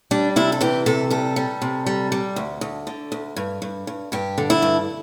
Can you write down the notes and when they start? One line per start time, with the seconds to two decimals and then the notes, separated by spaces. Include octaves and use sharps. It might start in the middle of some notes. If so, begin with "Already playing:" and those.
0.11 G3 D4
0.36 C3 E4
0.52 A4
0.61 E3 G4
0.86 C3 A4
1.10 G3 A4
1.36 G3
1.62 C3
1.86 G3
2.12 G3
2.36 D2
2.61 D2
2.87 D3
3.12 D2
3.36 G2
3.62 G2
3.87 G2
4.12 G2 G4
4.38 D3
4.50 E4
4.62 G2